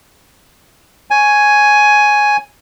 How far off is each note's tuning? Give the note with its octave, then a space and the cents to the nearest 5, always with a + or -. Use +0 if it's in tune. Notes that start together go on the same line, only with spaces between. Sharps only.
C#5 +0 G#5 +5